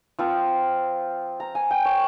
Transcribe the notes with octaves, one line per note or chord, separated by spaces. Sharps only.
F3 C4 F4
A#5
G#5
G5
C#5